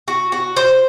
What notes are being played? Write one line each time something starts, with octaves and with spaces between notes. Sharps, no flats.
F#4
F#4
C5